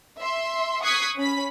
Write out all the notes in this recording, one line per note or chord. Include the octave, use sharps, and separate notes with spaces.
E5 C6
C#6 D#6 F#6 G#6 B6 C7
C#4 B5 B6